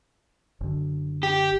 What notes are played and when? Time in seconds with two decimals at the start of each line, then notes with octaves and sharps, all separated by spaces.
0.61 F#1 D3
1.23 G4